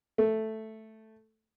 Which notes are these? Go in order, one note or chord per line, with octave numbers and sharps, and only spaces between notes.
A3